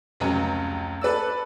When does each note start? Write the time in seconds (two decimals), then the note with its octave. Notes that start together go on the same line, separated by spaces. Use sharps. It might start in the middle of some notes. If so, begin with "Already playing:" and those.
0.20 F1 C#2 F#3 C#4 A#5
1.01 A4 B4 D5 E6